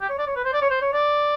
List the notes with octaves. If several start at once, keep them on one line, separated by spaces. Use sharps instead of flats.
G4
C#5
D5
C#5
B4
C5
D5
C#5
C5
C#5
D5